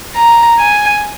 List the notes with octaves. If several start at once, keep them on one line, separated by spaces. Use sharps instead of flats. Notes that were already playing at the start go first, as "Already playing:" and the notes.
A#5
G#5